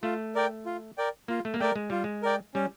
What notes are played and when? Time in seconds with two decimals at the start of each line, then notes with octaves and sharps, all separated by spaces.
0.03 A3 F4
0.35 A#4 D5 G5
0.66 F4
0.98 A#4 D5 G5
1.28 A#3 F4
1.45 A3
1.54 A#3
1.60 A3 A#4 D5 G5
1.76 G#3
1.90 G3 F4
2.04 G#3
2.23 A#4 D5 G5
2.55 G3 C#4